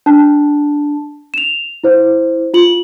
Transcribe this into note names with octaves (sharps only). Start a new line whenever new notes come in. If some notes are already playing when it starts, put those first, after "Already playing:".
D4 A5
E7 F7
E4 C5
F4 F#7